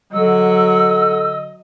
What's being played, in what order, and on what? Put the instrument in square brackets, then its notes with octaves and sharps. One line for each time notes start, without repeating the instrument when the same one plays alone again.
[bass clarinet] D3 [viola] F#3 F#5 [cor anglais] D#5 [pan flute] E6